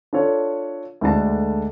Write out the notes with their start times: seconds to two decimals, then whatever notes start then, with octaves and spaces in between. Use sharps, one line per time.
0.13 D4 F4 A4 C#5
1.01 D2 D3 G#3 D4 A4 A5